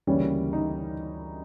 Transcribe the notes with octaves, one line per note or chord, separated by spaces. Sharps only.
D2 C#3 E3 G3 A#3 C#4
D#4